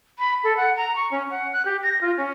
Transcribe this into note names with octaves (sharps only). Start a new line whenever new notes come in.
B5
A4
F#5
A#5
C#6
C#4
F#5
F#6
G4
A#6
F4
C#4